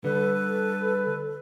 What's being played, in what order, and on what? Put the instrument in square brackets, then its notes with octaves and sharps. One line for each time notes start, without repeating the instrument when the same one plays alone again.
[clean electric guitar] D3 G3 [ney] A4 [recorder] B4